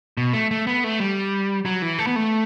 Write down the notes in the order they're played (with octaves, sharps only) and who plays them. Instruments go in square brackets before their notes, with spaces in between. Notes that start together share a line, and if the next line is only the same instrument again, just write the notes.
[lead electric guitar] B2
A3
A3
B3
A3
G3
F#3
E3
A3
B3
A3